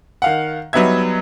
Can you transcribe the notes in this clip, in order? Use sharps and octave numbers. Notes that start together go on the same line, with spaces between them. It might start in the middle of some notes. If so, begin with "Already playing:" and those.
D#3 F5 F#5
F#3 G3 B3 D#4 E5 G#6